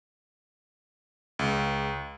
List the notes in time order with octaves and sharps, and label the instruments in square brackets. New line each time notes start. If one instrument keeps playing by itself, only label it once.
[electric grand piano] C#2